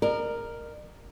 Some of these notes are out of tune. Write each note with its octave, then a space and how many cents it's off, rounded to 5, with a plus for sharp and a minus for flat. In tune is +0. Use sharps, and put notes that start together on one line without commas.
A#4 +0 D5 +45